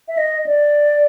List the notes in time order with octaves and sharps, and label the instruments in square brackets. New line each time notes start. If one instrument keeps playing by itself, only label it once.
[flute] E5
D#5
D5